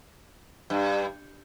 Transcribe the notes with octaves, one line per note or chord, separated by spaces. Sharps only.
G2